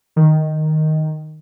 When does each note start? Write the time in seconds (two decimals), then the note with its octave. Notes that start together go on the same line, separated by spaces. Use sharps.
0.16 D#3